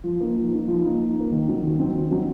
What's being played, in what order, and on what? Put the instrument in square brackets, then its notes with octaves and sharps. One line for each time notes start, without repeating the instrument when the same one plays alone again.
[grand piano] F3
A#3 D#4
F3
A#3 D#4
F3
A#3 D#4
F3
A#3 D#4
D#3
F#3 C4 D#4
D#3
F#3 C4 D#4
D#3
F#3 C4 D#4